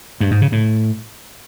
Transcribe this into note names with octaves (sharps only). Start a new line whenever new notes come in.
G2
G#2
C#3
A2